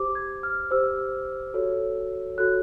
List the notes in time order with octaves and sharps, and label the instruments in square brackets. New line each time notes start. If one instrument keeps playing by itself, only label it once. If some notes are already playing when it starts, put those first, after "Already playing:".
Already playing: [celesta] G4 C5 D6
G#6
F6
G4 C5 E6
F#4 A4 C#5
F#4 A4 C#5 F#6